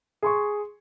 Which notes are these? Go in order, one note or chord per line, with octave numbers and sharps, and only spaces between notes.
G#4 C6 C#6